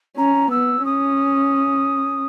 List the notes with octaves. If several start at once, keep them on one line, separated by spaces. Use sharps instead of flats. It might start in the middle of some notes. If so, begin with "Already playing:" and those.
C#4 A#5
B3 E6
C#4 D#6